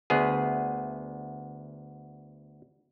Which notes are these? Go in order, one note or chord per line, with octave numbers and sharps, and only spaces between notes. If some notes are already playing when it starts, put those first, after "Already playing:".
D2 B3 G#4